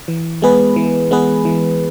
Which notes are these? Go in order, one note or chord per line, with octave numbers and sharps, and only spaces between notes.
E3
G#3 B3 G#4 B4
E3
G#3 B3 G#4 B4
E3